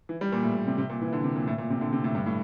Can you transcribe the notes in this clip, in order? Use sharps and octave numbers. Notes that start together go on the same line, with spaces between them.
E3
G3
A#2
A2
A#2
C3
C3
A#2
E3
D3
C3
A#2
A2
A#2
C3
D3
C3
A2
G2
A2